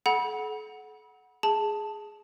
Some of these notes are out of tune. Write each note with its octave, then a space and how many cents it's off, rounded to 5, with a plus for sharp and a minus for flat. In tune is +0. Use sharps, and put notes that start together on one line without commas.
A4 -45 F#5 +0 B5 -30
G#4 +0 A5 +0